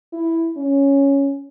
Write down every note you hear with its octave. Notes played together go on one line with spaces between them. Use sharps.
E4
C#4